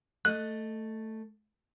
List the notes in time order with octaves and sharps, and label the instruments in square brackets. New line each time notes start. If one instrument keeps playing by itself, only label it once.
[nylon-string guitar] A3 D#5 [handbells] F#6